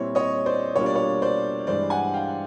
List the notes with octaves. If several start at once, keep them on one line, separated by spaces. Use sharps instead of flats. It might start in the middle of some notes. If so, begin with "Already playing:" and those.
Already playing: A#2 G3 C4 E4 C#5
C#5 D#5
C5 D5
B2 G3 A#3 D4 F4 C#5
D5
C#5
C5 D5
G2 E3 G#3 C5 D5
F#5 G#5
F5 G5